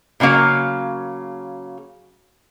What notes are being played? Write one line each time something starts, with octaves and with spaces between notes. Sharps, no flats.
A#2 C#3 F#3 A#3 F5